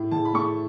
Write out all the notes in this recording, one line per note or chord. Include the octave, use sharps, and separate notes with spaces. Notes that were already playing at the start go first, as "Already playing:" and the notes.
Already playing: A2
A2 A5
B5
A3 C#6